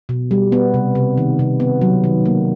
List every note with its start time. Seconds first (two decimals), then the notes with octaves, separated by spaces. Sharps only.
0.09 B2
0.31 G3
0.52 B3
0.74 C3
0.95 C3
1.18 D#3
1.39 C3
1.60 B3
1.81 F#3
2.04 D#3
2.26 A#3